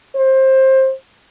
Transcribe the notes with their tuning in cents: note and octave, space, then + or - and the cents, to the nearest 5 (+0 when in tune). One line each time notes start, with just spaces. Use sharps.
C5 +20